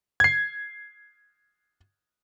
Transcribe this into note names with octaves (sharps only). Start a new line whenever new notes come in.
G#6 C7